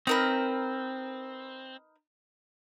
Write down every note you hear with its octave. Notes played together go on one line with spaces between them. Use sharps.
C4 D#4 A#4 B4